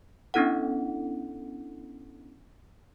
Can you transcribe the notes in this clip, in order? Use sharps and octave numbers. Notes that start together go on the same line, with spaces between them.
B3 C#4 D4 E4 A4 F#5